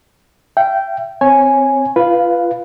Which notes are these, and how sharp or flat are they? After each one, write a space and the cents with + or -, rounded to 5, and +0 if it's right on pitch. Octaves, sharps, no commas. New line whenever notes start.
E5 +40 G5 -10
C4 +0 C#5 -15 G#5 +0
F4 -25 B4 +0 F5 +0